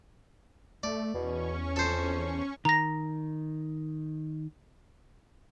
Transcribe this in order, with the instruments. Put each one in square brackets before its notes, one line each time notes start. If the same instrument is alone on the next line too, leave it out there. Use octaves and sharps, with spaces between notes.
[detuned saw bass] A3 [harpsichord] D5
[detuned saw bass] E2 [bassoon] B2 [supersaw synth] C#4 C#6
[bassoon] F2 [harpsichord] A4 C5
[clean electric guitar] D#3 [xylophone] A#5 A#6